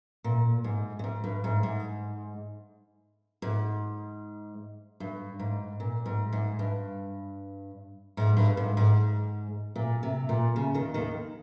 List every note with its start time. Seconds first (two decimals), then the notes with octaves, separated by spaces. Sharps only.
0.24 A#2
0.64 G#2
0.99 A#2
1.04 G#2
1.24 G2
1.44 G#2
1.63 G#2
3.42 G#2
5.00 G2
5.39 G#2
5.80 A#2
6.06 G#2
6.33 G#2
6.59 G2
8.17 G#2
8.37 G2
8.57 G#2
8.77 G#2
9.76 A#2
10.03 C3
10.29 A#2
10.56 C#3
10.74 D#2 D#3
10.94 D#2 D#3